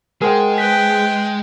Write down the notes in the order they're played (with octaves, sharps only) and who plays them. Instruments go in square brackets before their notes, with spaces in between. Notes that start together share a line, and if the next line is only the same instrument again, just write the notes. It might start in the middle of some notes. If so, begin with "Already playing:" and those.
[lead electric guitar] G#3 [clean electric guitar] G#4 C5 [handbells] A#4 F#5 G5
[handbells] B4 F#6 B6 [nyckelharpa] G5